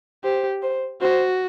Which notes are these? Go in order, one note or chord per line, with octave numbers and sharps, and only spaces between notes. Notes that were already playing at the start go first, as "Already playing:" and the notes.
G4 C5
C5
F#4 C5